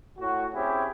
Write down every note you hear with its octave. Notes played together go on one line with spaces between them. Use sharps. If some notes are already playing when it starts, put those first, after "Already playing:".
A2 F#4
C4 C#4 E4 G4 G#4